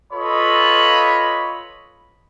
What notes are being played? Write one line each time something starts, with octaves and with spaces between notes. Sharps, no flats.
F4 A4 B4 C#5 D#5 B5